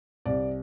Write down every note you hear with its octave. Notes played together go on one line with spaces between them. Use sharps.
C2 D5